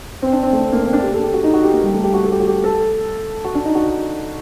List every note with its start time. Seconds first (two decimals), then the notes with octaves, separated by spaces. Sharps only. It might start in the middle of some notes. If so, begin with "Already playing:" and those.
0.22 C4
0.33 D4
0.43 C4
0.53 A3
0.73 A#3
0.83 C4
0.93 D4
1.03 G4
1.13 A4
1.23 G4
1.34 F#4
1.44 D#4
1.54 F#4
1.64 G4
1.73 A#3
1.84 G3
1.94 A3
2.04 G4
2.14 F#4
2.24 A4
2.32 G4
2.40 F#4
2.48 G4
2.64 A4
3.45 F#4
3.55 D4
3.65 D#4
3.75 F#4